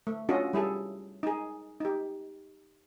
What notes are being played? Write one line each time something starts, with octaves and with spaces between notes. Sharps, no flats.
A3
C#4 D4 F4 F#4 A4 D#5
G3 E4 G#4 A4
D#4 G#4
D#4 G4